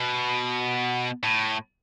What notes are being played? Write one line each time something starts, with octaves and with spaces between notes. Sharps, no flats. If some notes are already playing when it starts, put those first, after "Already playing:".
Already playing: B2
A2